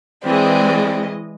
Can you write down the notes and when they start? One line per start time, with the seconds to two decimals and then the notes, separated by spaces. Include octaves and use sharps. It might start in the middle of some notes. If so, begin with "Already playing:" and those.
0.24 E3 G#3 C4 D5 D#5